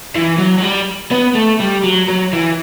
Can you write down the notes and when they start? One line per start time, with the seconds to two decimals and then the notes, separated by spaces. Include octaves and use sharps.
0.16 E3
0.39 F#3
0.58 F#3
0.63 G3
1.11 B3
1.35 A3
1.60 G3
1.84 F#3
2.08 F#3
2.33 E3